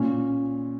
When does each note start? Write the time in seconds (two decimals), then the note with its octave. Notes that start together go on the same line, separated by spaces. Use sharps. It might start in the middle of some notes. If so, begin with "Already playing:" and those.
Already playing: A#2 C#4